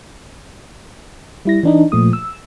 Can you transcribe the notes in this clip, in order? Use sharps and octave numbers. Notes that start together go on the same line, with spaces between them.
G3 E4 A#6
E3 D4 D#4
A#2 F3 A3 D#6
E6